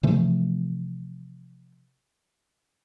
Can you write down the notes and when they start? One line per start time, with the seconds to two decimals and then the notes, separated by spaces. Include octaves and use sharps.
0.03 C3 E3 F3 A3